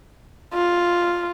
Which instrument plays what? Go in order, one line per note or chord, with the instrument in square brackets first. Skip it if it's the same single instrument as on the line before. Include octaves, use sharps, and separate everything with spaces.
[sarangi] F4